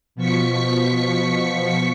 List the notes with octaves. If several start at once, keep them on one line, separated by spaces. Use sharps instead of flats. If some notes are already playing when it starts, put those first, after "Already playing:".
B2 F3 C#6 B6 C#7